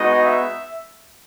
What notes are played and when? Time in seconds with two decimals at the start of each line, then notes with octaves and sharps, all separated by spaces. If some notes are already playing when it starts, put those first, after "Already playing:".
Already playing: G#3 B3 D#4 F#4 D#5
0.23 E5